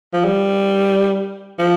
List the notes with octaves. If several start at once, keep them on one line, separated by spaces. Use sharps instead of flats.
F3
G3
F3